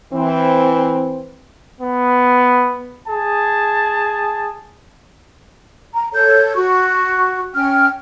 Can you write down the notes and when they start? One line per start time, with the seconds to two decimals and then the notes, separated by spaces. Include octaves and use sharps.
0.13 E3 C4
1.81 B3
3.08 G#4 A5
5.94 A#5
6.13 A4 C#5 G6
6.55 F#4 C#6
7.53 C#4 G5 F6